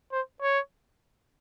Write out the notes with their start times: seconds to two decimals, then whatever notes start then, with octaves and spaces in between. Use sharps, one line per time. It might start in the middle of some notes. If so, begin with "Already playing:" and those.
0.12 C5
0.42 C#5